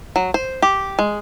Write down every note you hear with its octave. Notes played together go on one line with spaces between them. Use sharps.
F#3
C5
G4
G#3